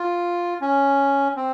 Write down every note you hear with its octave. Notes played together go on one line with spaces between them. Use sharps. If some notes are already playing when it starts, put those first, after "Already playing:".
Already playing: F4
C#4
C4